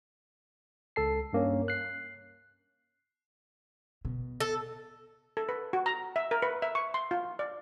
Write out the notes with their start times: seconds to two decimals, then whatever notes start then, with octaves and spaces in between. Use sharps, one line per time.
0.96 C#2 A4 A5 C7
1.33 G2 A#3 C#4 C#5
1.68 F#6 C7
4.05 B2
4.40 A4
5.37 A4
5.49 B4
5.73 F#4
5.86 A#5
6.16 E5
6.31 A#4
6.42 B4
6.62 E5
6.75 C#6
6.94 C6
7.11 F4
7.39 D5